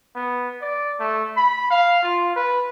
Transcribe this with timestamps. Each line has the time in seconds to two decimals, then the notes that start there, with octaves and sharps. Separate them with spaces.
0.15 B3
0.61 D5
0.99 A3
1.36 B5
1.70 F5
2.02 F4
2.36 B4